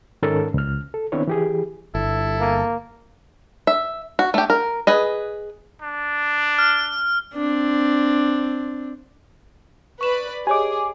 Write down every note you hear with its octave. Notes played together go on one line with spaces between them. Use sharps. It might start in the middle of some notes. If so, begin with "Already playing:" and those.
G#2 D#3 C#4 A4 A#4 A5
C#2 F6
A4
D#3 B3 C4 D4 E4 C#5
E3 G4 G#4
G1 E4 A4
A#3
E5
F#4
A3 G4
A#4
G#4 B4 D#5
D4
F6
C4 D4
B4 D5 B5 C#6 E7
G4 G#4 C#5 D#5 G#5 D6